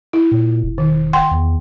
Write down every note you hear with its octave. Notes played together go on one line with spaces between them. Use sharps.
E4
A#2
E1
D#3
F#5 G5 C6
E2